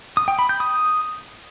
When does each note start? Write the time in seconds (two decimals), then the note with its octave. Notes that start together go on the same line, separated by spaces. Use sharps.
0.17 D#6
0.28 G5
0.39 B5
0.49 G6
0.60 D#6